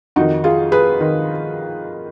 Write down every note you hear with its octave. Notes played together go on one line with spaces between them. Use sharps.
F2 D#3 D#4 F#4
F4 G#4
G#4 B4
D#3